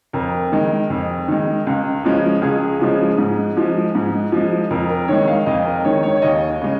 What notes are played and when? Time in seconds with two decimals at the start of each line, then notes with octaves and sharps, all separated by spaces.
0.13 F2 A#4
0.52 D#3 G#3
0.90 F2
1.28 D#3 G#3
1.67 C#2
2.04 C#3 F3 G#3
2.42 C#2 G#4
2.80 C#3 F3 G#3
3.18 G#2
3.57 F3 G#3
3.95 G#2
4.32 F3 G#3
4.70 F2 A#4
4.89 A#4
5.08 D#3 G#3 C#5
5.28 F5
5.46 F2 D#5
5.65 A#4
5.85 D#3 G#3 C#5
6.03 C#5
6.17 C#5
6.22 D#2 D#5
6.61 C#3 G#3